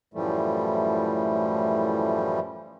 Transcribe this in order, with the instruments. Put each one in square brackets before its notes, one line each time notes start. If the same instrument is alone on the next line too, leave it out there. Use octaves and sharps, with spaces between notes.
[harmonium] F#2 A2 E3 F3 G3 A3